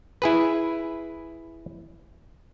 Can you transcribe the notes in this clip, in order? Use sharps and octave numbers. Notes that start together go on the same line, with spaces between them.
E4 G#4 B4